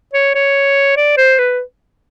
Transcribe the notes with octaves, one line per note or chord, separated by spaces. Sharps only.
C#5
C#5
D5
C5
B4